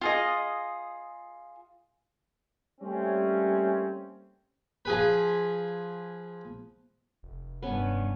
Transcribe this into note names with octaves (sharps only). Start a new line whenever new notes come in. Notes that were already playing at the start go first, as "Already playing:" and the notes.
F4 G#4 D#5
G3 A3 A#3 C4 C#4
F3 G#4 B4
F1
G2 B3 C#4